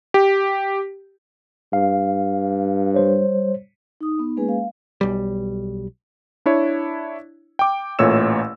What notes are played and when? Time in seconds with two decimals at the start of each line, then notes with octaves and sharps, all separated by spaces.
0.14 G4
1.73 G2 F5
2.94 G3 C5 C#5
4.01 D#4 D#6
4.19 B3 D#4
4.37 G#3 A#3 C#4 G#4 B4 G#5
4.49 F5
5.01 B1 G3
6.46 D4 E4 C#5
7.59 G5 D6
7.99 A1 A#2 A3 C#5 E6 E7